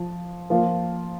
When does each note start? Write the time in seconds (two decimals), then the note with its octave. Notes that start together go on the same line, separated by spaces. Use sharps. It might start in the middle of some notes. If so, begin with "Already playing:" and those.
Already playing: F3
0.50 F3 A#3 F4